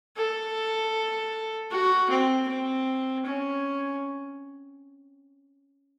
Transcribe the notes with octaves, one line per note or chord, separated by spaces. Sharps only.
A4
F#4
C4
C4
C#4